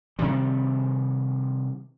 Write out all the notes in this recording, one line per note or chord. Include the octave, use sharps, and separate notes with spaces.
C3 D#3 G3